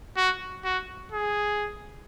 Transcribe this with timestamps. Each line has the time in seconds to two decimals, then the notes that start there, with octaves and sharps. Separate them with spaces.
0.17 F#4
0.64 F#4
1.12 G#4